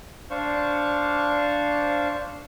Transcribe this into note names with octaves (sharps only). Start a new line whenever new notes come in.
D4 C5 F5 C#6